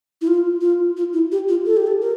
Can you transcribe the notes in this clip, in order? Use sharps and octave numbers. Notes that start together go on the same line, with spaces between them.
E4
F4
F4
F4
E4
G4
F4
A4
G4
A4
A#4